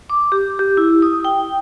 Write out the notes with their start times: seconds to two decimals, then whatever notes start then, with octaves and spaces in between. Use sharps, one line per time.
0.10 D6
0.32 G4
0.59 G4
0.77 E4
1.02 D#6
1.25 G5